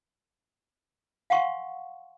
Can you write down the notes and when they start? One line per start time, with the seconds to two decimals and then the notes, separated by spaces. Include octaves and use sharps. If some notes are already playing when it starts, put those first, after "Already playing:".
1.30 F5 F#5 G#5 C6 C#6